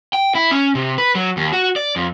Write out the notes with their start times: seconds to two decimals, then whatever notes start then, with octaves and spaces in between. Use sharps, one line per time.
0.13 G5
0.35 E4
0.51 C#4
0.75 C3
0.98 B4
1.15 F#3
1.37 D#2
1.53 F#4
1.76 D5
1.96 F2